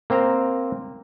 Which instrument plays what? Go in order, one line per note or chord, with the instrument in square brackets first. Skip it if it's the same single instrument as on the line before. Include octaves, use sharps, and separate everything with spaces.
[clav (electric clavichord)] A#3 C4 C5 A#5